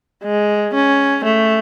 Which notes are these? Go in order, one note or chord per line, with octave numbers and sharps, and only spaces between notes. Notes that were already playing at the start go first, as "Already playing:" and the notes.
G#3
C#4
A3